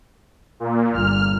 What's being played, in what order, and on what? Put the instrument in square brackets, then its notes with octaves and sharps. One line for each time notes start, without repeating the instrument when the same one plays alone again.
[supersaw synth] A#2
[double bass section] G1 [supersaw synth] F6